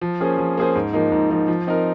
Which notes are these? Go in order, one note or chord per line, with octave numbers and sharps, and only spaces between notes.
F3
A#3 C#4 G#4 C5
F3
A#3 C#4 G#4 C5
G#2
F3 A#3 D#4
G#2
F3 A#3 D#4
F3
C4 D#4 A#4